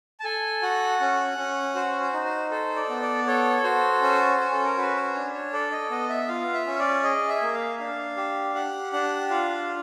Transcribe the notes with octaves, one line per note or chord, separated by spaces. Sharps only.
A5
A4 G#5
F#4 F#5
C#4
C#4
F#4 C5
C5
D#4
C5
A4 C5
D5
B3
D5
A4 C#5
F#4 C5
C#4
C#4
A4
A#4
F#4 B4
C5
D4 C#5
C#5
A4 D5
D#5
B3 D#5
E5
F4 F5
E5
C#4
D5
G#4 D#5
E5
A#3
F5
D4 F5
G4
G4 F#5
D4 F#5
F4 F5